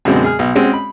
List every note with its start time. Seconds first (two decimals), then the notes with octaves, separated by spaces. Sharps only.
0.05 F#2 B2 D3 G#3 C4
0.24 G#4 F6
0.39 B1
0.55 G#3 C4 C#4 F#4
0.73 B5